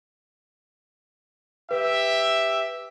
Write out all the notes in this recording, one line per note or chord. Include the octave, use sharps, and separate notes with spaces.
G4 B4 E5